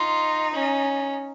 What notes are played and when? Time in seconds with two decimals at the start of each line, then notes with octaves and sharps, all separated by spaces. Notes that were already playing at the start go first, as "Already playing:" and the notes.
Already playing: D#4 F4
0.53 C#4